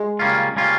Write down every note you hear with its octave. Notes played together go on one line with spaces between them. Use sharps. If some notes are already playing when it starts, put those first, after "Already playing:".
Already playing: G#3
C#3 G3 A#3 C#4 F4
C#3 G3 A#3 C#4 F4